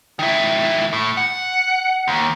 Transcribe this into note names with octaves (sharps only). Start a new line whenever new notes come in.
D#3 E4
A2
F#5
D#2